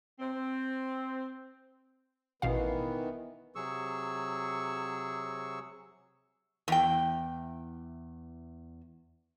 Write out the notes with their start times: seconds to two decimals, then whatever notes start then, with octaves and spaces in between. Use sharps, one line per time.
0.20 C4
2.42 A1 B2 D#3 E3 B3 F5
3.55 C3 F#3 G#4 C#6 E6
6.68 E2 G5